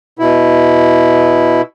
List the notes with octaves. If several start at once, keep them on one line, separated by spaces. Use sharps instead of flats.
B2 E4